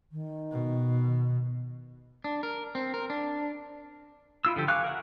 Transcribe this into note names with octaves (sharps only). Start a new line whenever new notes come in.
D#3
B2
D4
A#4
C4
A#4
D4
E4 F4 E6
D3 F3 G4
F5 G#5 C#6 D6 F#6
A#4 E5 F#5